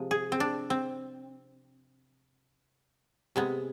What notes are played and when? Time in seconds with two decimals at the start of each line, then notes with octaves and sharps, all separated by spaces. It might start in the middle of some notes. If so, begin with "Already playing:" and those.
Already playing: C3 F3 G#3
0.11 G#4
0.32 C4
0.40 D4
0.70 C4
3.36 C3 G#3 B3